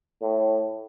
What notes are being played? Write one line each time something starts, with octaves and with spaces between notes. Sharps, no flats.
A2